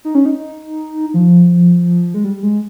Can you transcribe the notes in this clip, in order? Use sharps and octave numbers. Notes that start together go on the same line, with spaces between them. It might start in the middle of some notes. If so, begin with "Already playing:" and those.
D#4
C#4
D#4
F3
G#3
G3
G#3